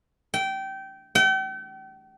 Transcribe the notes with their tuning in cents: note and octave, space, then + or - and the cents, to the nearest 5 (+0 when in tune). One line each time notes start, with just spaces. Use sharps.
G5 -20
G5 -40